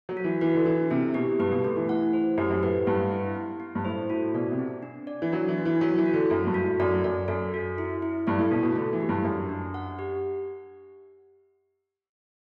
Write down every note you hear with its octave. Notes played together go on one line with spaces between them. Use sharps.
F#3
F#4
E3
E3 B4
D3
E3 D4
C3 E4
B2 G4
G2 B4
B2
D3 A3
E3
E3 F#5
C5
F#2 G4
F#2
A2 B4
G2 F#5
E4
B3
B3
G2
A2 C5
A2 F#4
B2 D5
C3
C4
D4
D5
E3
F#3 D4
E3
B3
E3
F#3 F#4
E3
F#4
D3
F#2 A4
G2
F#4
A2
F#2 D5
F#2 D5
F#2 A4
F#4
E4
E4
G2 D5
A2
B2 F#4
B2
D3 A3
E3
G4
G2
F#2 D4
D4
F#5
G4